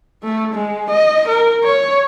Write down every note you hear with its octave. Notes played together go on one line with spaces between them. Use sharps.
A3
G#3
D#5
A#4
C#5